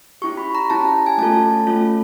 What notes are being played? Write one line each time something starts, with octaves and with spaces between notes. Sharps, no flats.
C#4 E4 G4 C#6
B5
A#5
C#4 E4 G4 A5
G#5
A3 C#4 F4 A4 A5
A3 C#4 F4 A4